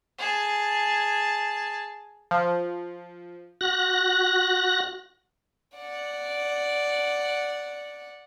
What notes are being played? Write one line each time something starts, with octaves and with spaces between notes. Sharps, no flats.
G#4 A5
F3
F#4 F#6 A#6
D5 F#5